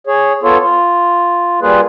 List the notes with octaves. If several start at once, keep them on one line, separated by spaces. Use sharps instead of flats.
G#4 C#5
B3 F4 A4 C#5
F4
G3 A#3 F4 G#4 B4